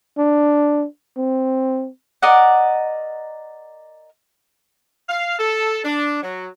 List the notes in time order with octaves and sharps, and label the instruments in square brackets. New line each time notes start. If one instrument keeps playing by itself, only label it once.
[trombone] D4
C4
[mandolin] A#4 D5 D#5 F#5
[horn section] F5
A4
D4
F#3